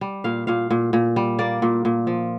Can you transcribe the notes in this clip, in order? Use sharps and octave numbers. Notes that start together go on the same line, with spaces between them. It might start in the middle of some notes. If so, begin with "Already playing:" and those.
G3
A#2 F5
A#2 F5
A#2
A#2
G3
A#3 D5
A#2
A#2
F3